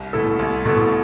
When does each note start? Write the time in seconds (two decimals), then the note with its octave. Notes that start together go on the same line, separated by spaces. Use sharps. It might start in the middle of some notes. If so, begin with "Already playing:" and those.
Already playing: C2
0.13 B2 A3 E4 A4
0.39 C2
0.65 B2 A3 E4 A4